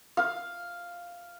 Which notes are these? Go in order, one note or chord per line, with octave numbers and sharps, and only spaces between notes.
F5